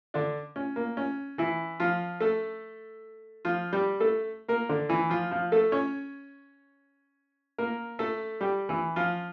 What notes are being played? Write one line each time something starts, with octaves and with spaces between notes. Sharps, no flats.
D3 D4
C#4
A#3
C#4
E3 E4
F3 F4
A3 A4
F3 F4
G3 G4
A3 A4
A#3 A#4
D3 D4
E3 E4
F3 F4
F3 F4
A3 A4
C#4 C#5
A#3 A#4
A3 A4
G3 G4
E3 E4
F3 F4